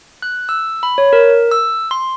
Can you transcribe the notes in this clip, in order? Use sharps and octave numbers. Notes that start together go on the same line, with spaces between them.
F#6
E6
B5
C#5
A#4
E6
C6